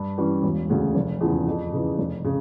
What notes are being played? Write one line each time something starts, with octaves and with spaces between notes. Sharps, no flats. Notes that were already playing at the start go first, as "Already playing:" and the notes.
Already playing: G2
E3 G3 C#4
E1
D2 C#3
F1
E2 C#3 F3
F2
C#3 E3
F1
C#3